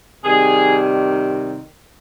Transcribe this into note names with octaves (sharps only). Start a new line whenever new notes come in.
C3 D#3 G3 G#4